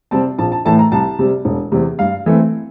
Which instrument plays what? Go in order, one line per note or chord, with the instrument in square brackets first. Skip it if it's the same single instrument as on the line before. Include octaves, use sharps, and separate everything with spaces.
[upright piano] C3 G3 C4 A5
A#1 A5
A5
A2 E3 A3 A5
A#5
C2 A5
C3 G3
E1
E2 C3
G2 F5
E3 A3 C4